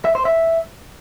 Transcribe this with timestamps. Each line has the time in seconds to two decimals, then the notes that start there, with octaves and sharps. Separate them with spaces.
0.05 E5
0.15 C5
0.25 E5